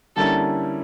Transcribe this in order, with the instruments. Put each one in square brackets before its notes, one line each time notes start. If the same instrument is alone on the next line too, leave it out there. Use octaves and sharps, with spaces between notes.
[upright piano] D3 G3 A#3 C#4 E4 [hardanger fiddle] A4